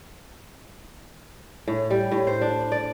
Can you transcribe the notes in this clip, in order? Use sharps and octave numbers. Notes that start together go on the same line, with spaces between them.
A2
G3
A2
C5
D4
D5